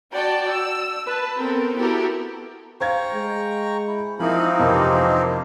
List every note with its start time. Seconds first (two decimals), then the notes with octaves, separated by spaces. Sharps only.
0.13 F#4 D5 G5 A5
0.52 E6
1.06 B4 A5
1.37 B3 C4 A4 A#4
1.75 B3 E4 F#4 G4 A4 A#4
2.81 C5 F5 G5 A#5 C#6 G#6
3.14 G#3
3.87 E4
4.20 F3 A#3 C4 D#4 E4 F5 G#5 B5
4.60 F2 C3 E3 G#3 D4 F4 A#4